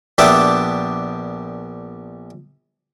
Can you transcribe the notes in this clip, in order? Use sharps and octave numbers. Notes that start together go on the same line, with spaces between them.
A#1 B3 D4 G4 E5 D6